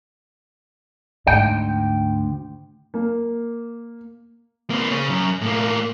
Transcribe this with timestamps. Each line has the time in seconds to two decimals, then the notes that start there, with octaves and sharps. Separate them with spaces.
1.27 D2 G#2 G5
2.94 A#3
4.70 A#3 C4
4.91 C#3 C#5
5.10 F#2
5.41 A2 A#3